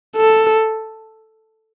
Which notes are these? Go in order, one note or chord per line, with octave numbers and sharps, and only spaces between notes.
A4